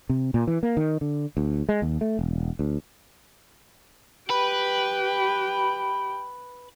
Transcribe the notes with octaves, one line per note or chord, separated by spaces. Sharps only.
C3
A#2
E3
A#3
D#3
D3
D2
G#3
D#2
A3
E1
D2
G4 B4 G5